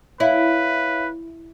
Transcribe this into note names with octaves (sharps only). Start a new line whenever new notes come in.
E4 B4 C#5 E5 F5